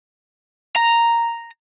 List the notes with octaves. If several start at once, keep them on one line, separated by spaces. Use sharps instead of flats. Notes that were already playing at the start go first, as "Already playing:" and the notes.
A#5